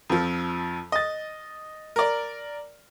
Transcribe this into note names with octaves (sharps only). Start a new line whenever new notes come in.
F2 F3
D#5 A6
A#4 D5